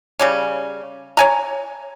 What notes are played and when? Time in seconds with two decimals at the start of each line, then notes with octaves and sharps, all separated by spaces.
0.19 C#3 G3 C#4
1.17 C#5 G#5 A#5